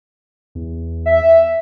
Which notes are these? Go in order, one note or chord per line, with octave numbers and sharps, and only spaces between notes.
E2
E5